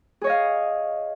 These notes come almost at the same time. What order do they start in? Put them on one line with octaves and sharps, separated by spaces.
G#4 C#5 D#5 F5